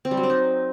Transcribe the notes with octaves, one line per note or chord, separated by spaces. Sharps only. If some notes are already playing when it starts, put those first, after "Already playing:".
C4
G3
F#3
D4
D#4